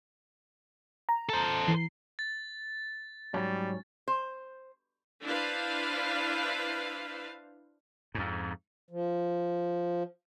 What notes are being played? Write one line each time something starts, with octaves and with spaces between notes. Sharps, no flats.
A#5
A4 C5
E3 C7
A6
G#2 F#3 G3 C#4
C5
D4 E4 B4 C5 F5
F2 G#2
F3